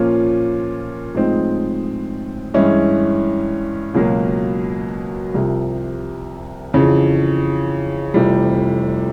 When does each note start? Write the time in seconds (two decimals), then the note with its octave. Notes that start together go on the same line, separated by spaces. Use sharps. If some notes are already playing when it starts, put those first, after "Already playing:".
Already playing: A#2 F3 A#3 C#4 F4
1.14 A2 F3 G#3 C4 D#4
2.54 G2 E3 G#3 C#4 E4
3.94 C#2 B2 F#3 A#3
5.34 C2 C3 F3
6.74 F2 C#3 E3
8.14 F1 F2 C3 E3 G3